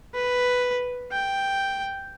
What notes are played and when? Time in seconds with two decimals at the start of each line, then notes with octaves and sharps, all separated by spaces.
0.14 B4
1.12 G5